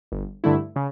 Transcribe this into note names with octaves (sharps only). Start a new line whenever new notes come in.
G1
G2 D3 A3 E4
C#3